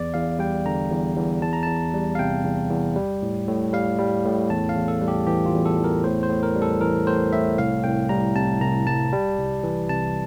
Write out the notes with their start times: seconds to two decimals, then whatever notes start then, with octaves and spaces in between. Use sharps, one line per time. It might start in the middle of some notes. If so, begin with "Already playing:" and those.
Already playing: E2 D5
0.14 E2 F5
0.39 G3 G5
0.65 D3 A#5
0.91 E2
1.16 E2
1.42 E2 A5
1.53 A#5
1.63 E2 A5
1.94 G3
2.15 F5
2.19 C3 G5
2.45 E2
2.70 E2
2.96 G3
3.22 A2
3.47 A2
3.73 G3 F5
3.99 G3
4.25 A2
4.50 E2 A5
4.69 F5
4.75 E2
4.88 A4
5.01 G3
5.08 G4
5.27 E3 G4
5.46 F4
5.53 E2
5.65 A4
5.79 E2
5.84 A#4
6.04 A2 C5
6.23 C5
6.30 A2
6.43 A#4
6.56 G3
6.62 A4
6.81 E3 A#4
7.06 A2 C5
7.33 A2 E5
7.58 C2 F5
7.83 C2 G5
8.09 G3 A#5
8.35 C3 A5
8.61 C2 A#5
8.86 C2 A5
9.13 G3
9.38 C2
9.63 E3
9.89 C3 A5